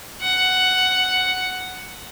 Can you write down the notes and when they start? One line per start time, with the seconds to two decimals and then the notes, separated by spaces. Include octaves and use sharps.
0.21 F#5